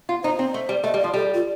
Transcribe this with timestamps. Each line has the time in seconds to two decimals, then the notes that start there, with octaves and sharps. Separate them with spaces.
0.09 F4
0.23 D#4 C5
0.39 C4
0.54 A3
0.69 G3
0.83 A3 D#5
0.94 G3
1.00 F3 D5
1.14 G3 A4
1.34 F4